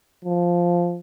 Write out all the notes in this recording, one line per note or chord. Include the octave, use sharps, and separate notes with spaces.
F3